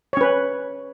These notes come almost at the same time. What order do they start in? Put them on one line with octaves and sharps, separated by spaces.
C#5 C#4 B4